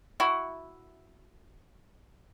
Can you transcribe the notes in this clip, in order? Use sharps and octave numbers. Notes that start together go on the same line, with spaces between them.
E4 F#4